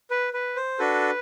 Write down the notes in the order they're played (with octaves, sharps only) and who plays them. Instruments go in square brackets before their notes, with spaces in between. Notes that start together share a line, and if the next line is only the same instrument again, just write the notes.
[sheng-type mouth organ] B4
B4
C5
D4 F#4 A4 B4